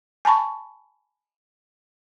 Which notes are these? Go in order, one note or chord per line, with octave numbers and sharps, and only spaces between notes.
G#5 A5 B5 C#6